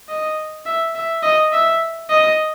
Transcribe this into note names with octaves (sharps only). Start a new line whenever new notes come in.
D#5
E5
E5
D#5
E5
D#5